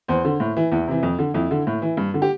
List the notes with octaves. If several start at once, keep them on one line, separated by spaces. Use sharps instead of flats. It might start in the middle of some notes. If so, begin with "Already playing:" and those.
E2 C5
D3
A2
E3
E2 E4
C3 E3
F2
D3
F2 E4
D3
A2
E3
G2
D3
G4